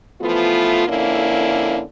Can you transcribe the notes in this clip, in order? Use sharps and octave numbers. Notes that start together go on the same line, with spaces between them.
E3 F3 A3 B3 F4
F2 D3 A#3 C#4 E4